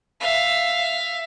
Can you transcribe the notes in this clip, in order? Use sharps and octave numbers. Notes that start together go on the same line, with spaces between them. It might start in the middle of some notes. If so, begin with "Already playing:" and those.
E5 F5